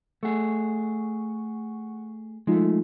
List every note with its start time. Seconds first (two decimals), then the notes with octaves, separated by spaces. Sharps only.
0.23 A3 G#4 F#5 C#6
2.47 F3 G#3 A3 D#4 F4